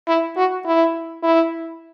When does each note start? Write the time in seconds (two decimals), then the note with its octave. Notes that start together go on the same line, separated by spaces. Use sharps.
0.08 E4
0.37 F#4
0.66 E4
1.23 E4